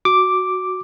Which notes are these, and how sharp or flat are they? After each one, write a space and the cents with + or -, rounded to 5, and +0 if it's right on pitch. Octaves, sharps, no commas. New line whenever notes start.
F#4 +0 D6 +0